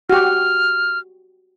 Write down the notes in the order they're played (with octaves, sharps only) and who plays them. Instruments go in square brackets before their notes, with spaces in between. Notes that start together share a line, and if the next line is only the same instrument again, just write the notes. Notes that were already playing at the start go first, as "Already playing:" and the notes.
[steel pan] F#4 G4 [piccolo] F6